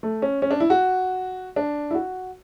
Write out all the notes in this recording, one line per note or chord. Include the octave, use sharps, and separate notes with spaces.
A3
C#4
C#4
D4
E4
F#4
D4
E4
F#4